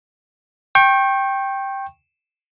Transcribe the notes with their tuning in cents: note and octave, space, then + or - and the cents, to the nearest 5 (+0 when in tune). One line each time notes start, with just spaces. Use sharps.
G5 +0 C#6 -35